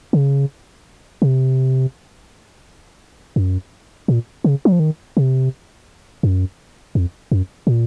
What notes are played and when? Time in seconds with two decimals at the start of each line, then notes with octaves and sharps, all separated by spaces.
0.13 C#3
1.22 C3
3.36 F#2
4.08 A#2
4.44 C#3
4.65 F#3
4.72 F3
4.80 D#3
5.17 C3
6.23 F#2
6.95 F2
7.32 F#2
7.67 A#2